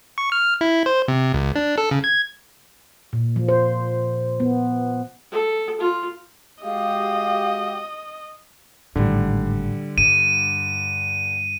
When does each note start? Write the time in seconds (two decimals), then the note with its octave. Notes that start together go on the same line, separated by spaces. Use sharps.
0.18 C#6
0.32 F6
0.61 E4
0.86 C5
1.08 C3
1.34 C#2
1.56 D4
1.78 A4
1.91 C#3
2.04 G#6
3.13 A#2
3.36 F3
3.49 C5
4.40 B3
5.31 A4
5.80 F4
6.64 G#3 F#4 G4 D#5 F5
8.96 G#1 A2 D3 G3
9.98 G2 D#7